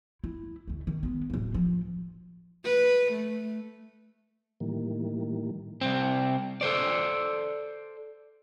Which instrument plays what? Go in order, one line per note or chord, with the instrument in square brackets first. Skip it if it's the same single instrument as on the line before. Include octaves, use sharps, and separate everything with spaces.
[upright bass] E4
D2 A3
D#3
G#3 B3
D1 A#3
F3
[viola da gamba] B4
A3
[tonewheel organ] A2 D#3 E3 G3 A#3
[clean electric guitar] C2 F#2 C4
A4 B4 C5 D5